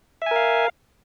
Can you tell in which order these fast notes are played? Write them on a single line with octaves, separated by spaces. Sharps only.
E5 G#5 A#4 F5